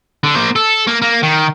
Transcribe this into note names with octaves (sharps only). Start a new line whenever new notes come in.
D3
A#3 C5
A4
A#3
A#3
D#3